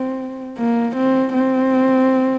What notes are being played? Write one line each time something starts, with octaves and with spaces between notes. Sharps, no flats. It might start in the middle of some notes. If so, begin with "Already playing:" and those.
Already playing: C4
A#3
C4
C4